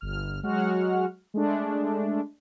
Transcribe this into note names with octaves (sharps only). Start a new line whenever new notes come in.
G1 F6
F#3 G#3 F#4 F#5 F6
G#3 A3 D4